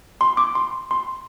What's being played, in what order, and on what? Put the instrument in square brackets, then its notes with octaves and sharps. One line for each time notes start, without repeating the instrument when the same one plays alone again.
[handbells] C6
D6
C6
C6